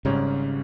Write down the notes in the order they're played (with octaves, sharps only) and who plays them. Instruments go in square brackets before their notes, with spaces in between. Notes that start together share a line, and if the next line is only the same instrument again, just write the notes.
[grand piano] G#1 G#2 G3 C#4 [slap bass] C#3